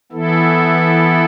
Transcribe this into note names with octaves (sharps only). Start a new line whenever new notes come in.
E3 B3 E4 A4